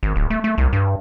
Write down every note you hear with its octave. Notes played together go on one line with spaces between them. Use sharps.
G#1
D1
A3
A3
C2
G2